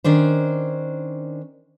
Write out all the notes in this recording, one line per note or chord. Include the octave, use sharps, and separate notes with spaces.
D#3 C#4 D4 C5